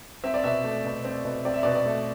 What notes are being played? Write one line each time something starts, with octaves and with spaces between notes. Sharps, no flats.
C4 E5
D5
B2 E5
A3
B2
C4
B2
C4 D5
E5
B2 D5
D5
A3